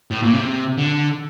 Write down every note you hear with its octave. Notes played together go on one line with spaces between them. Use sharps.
A2
A#2
C3
D3